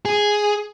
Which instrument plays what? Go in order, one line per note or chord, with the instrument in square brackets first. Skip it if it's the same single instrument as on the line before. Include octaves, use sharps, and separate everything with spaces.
[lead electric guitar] G#4